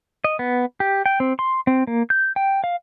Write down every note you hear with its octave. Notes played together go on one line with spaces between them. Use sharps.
D#5
B3
G4
G5
C4
C6
C4
A#3
G6
G5
F5